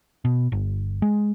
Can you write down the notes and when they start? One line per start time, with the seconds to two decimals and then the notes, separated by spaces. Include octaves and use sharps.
0.25 B2
0.52 G1
1.02 G#3